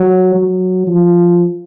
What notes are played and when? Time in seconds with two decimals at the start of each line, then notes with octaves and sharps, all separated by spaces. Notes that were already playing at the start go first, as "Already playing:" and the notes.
Already playing: F#3
0.35 F#3
0.87 F3